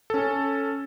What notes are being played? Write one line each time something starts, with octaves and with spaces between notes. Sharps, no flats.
C#4 A4